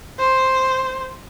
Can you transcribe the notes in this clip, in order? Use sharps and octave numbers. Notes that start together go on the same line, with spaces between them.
C5